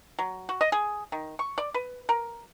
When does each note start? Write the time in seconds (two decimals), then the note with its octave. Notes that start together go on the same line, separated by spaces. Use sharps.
0.19 F#3
0.49 F#4
0.61 D#5
0.72 G#4
1.12 D#3
1.39 C#6
1.58 D5
1.74 B4
2.09 A#4